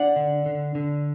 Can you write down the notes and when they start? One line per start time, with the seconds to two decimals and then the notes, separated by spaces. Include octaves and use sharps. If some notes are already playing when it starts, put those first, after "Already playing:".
Already playing: D4 D5 F#5
0.16 D3
0.46 D3
0.75 D3